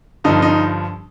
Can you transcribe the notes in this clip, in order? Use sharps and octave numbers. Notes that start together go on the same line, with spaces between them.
G2 D3 F3 D#4
D#4